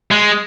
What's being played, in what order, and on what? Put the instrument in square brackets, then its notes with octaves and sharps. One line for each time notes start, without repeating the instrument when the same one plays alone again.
[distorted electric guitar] G#3